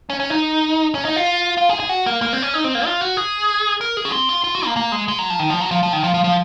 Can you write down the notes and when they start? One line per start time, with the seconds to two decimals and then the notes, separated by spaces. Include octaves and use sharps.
0.10 C#4
0.20 C#4
0.30 D#4
0.95 C#4
1.05 D#4
1.16 F4
1.57 F4
1.69 G#4
1.80 G#4
1.89 F#4
2.06 A#3
2.22 A#3
2.33 C4
2.42 C#4
2.54 D#4
2.64 C4
2.75 A#3
2.85 F4
3.01 F#4
3.17 G#4
3.81 A#4
3.97 G#4
4.05 C#4
4.12 C4
4.29 F4
4.44 F4
4.55 F#4
4.66 A#3
4.77 A#3
4.92 G#3
5.08 G#3
5.19 F#3
5.30 F3
5.39 D#3
5.50 F3
5.61 F#3
5.71 F3
5.83 F3
5.93 D#3
6.04 F3
6.14 F3
6.24 F3